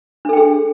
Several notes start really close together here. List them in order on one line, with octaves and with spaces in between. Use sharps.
D4 A4 G5 G#4